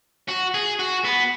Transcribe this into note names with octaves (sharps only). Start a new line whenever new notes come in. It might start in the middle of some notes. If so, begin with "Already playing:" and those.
F#4
G#4
F#4
B3